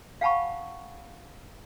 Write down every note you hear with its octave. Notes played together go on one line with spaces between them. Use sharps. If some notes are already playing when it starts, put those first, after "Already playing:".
F5 F#5 G#5 A5 B5 C#6